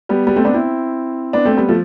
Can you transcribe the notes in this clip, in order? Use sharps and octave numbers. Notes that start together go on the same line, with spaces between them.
G3 B3
G3 B3
A3 C4
B3 D4
C4 E4
B3 D4
A3 C4
G3 B3
F3 A3